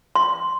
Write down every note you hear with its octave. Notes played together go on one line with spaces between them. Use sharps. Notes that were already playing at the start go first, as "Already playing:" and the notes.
C6